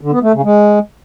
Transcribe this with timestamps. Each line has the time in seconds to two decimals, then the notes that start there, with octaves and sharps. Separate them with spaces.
0.01 D3
0.12 B3
0.23 A3
0.34 C#3
0.44 G#3